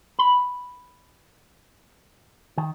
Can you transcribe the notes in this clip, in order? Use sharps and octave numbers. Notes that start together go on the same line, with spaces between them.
B5
D#3